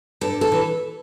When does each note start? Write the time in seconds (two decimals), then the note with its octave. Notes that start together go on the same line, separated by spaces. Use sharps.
0.21 G2 A4
0.41 A4
0.52 E3